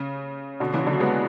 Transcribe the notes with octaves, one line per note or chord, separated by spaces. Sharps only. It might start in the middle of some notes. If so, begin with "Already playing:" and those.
Already playing: C#3
B2 D3
C#3 E3
D3 F#3
G#3 B3